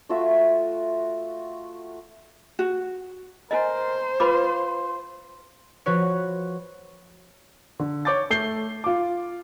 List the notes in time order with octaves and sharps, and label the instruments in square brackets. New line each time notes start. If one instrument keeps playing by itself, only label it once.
[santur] A3 F4 F#4 E5
[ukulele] F#4
[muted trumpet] A#4 [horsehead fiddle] C5 [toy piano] D#5 G#5
[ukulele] F4 [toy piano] B4 B5 D6 [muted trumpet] C6
[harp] F3 F#4 B4 C#5
[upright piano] D3
C#5 C#6 D6 G6 A6
A3 G6 C7 G7
F4 D6